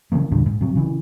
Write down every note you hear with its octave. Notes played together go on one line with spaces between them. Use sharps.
C#3 E3 F3 A#3
E2 G2 A#2 D3
G#2
C3 F#3
C#3 E3